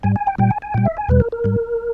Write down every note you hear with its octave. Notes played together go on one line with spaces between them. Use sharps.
G#2 G3 G#5
G#5
G5
A#2 G3 G5
G#5
G#5
A#2 G3 G5
E5
G#5
E2 B2 G3 B4
A#4
A#4
G#2 G3